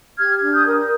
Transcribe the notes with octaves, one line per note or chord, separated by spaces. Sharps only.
G4 F6 G#6
D4
D#6 G6
A#4